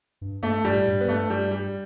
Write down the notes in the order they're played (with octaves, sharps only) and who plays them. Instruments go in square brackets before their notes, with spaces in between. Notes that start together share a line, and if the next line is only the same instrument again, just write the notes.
[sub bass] G2
[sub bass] G2 [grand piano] A3
[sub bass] G2 [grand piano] G3
[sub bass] A2
G2
[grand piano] B3
[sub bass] G2 [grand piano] A3
[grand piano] G3
G3